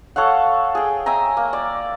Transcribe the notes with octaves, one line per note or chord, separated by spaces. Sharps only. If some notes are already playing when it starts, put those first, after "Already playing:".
A4 C#5 F5 F#5
G#4 G5
E5 G5 G#5 A#5
A#3
D5